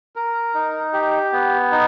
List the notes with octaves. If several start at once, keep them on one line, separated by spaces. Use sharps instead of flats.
A#4
D#4
G4
B3
D#4